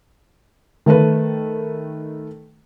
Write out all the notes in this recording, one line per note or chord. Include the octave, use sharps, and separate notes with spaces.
D#3 A3 A4 B4